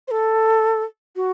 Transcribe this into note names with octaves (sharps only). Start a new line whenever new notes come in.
C5
A4
F#4